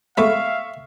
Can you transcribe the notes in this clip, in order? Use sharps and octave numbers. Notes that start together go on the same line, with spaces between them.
G#3 A3 B3 E5 F5 C#6